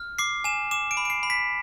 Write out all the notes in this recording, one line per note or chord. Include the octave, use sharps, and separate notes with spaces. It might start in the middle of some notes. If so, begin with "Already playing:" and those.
Already playing: F6
D6 C7
G#5 E7
D6 E7
D7
B5
D7
C7
B5
B6